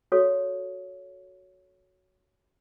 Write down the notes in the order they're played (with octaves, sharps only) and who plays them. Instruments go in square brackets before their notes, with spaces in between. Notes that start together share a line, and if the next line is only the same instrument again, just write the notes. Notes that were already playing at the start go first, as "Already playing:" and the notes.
[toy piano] F#4 A4 C#5